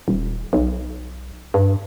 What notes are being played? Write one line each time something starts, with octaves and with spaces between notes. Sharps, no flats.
D#1
B1
G2